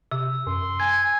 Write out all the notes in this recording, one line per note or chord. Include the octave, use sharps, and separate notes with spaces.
C3 E6
F#2 C6
G#5 G#6